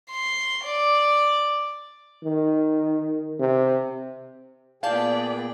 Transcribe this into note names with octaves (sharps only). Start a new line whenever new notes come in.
C6
D5
D#3
C3
A#2 B3 G#4 D5 F5 G5 A5 G6